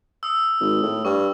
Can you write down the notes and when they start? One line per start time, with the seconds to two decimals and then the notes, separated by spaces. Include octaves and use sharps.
0.23 D#6 E6
0.60 G#1
0.83 A2
1.05 G2 C#6